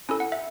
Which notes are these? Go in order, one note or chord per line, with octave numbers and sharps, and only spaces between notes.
C#4 E4 A4 G#5
F#5
E5